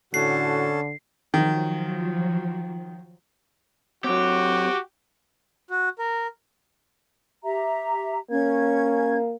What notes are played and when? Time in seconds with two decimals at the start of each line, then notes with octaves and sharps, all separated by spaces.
0.14 A2 D3 C#4 F#4 A4 C7
1.34 D#3 F3 F#3
4.04 F#3 C4 F#4 G4
5.70 F#4
5.99 A#4
7.44 G4 E5 A#5
8.30 A#3 C#4 G#6